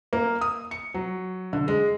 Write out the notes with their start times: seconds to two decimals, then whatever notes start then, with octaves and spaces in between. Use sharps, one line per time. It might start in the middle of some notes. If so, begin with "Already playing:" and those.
0.13 A#3
0.41 D#6
0.71 C#7
0.94 F#3
1.53 D3
1.68 G#3